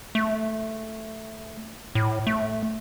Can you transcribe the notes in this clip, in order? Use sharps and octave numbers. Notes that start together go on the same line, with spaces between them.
A3
A2
A3